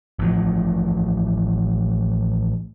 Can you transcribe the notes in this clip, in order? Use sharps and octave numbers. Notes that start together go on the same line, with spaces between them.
A1 A2 F3